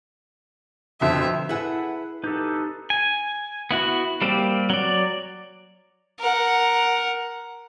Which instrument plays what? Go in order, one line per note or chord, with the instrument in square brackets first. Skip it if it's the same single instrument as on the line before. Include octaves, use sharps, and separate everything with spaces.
[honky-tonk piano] F2 B2 D3 [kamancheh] E5
[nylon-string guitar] E4 G#4 [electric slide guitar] A4 B4 [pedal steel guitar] E5 F#5 B5
[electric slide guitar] D#4 G4 A4 [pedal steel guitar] B4 G6
[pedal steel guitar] G#5
B3 E4 F#4
G3 A#3 C4 G4
F#3 D5
[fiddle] A#4 F#5